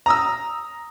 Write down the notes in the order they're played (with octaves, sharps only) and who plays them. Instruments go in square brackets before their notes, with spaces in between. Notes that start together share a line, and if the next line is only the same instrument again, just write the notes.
[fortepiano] A#5 D#6 E6